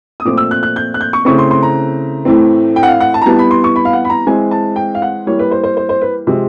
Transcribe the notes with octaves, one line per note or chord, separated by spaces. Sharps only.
D#6
A#2 F3 A3 C4 D6
E6
F#6
F#6
G6
F#6
G6
C#6
C#3 E3 A3 C4 C#6
C6
C6
A#5
A2 E3 A3 C4
G5
F#5
F5
F#5
A5
A#5
E3 G3 B3 A5
B5
C6
C#6
B5
F5
F#5
B5
A#5
E3 G#3 C4 G#5
A5
G5
F5
F#5
E3 G3 A#3 C#5
B4
C5
C5
C5
C5
B4
C3 F3 G#3 C4